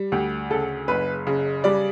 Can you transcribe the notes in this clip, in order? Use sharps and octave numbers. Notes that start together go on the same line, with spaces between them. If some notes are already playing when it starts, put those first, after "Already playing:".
Already playing: G3
D2 G4
C#3 A4
F#1 B4
C#3
G3 D5